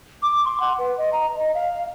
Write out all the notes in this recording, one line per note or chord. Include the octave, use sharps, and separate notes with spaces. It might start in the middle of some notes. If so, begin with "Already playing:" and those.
D6
C6
F#5
B4
D#5
A#5
D#5
F5